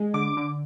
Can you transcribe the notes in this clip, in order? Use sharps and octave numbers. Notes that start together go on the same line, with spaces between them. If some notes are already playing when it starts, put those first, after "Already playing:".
Already playing: G#3
D3 D6
D3